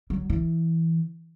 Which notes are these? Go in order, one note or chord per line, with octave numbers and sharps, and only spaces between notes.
F#3
E3